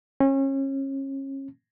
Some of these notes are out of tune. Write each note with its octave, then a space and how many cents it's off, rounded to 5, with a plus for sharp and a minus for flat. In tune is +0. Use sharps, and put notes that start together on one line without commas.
C#4 -30